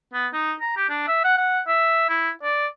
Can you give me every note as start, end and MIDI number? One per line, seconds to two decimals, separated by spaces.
0.14 0.27 59
0.33 0.53 63
0.61 0.76 82
0.77 0.85 67
0.89 1.04 62
1.08 1.20 76
1.24 1.34 78
1.38 1.59 78
1.68 2.05 76
2.09 2.30 64
2.43 2.67 74